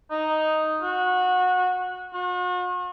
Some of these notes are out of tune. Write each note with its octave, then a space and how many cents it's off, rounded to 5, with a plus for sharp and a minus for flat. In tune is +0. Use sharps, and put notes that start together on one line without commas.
D#4 +0
F#4 -20
F#4 -45